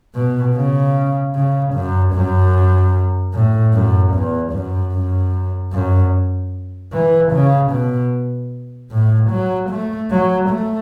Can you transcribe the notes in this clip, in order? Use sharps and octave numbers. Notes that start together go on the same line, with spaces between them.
B2
C#3
C#3
F#2
F#2
A2
F#2
E2
F#2
F#2
F#2
E3
C#3
B2
A2
F#3
A3
F#3
A3